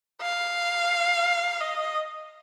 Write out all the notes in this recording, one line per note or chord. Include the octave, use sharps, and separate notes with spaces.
F5
D#5